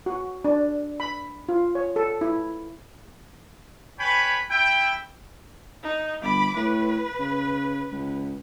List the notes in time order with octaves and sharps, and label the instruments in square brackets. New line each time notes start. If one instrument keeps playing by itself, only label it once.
[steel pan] F#4
D4
B5
F4
C#5
A4
E4
[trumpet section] B4 C#5 G5 G#5 B5
E4 G5
[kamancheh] D#4
[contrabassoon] G1 [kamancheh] B5 D6
[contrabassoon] A2 [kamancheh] B4
[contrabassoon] C#3
C#2